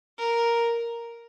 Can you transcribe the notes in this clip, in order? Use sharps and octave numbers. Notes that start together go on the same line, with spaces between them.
A#4